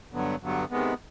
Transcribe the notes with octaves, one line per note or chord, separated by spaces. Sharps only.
G2 D3 F#3 B3
G2 D3 F#3 B3
C3 D#3 G#3 B3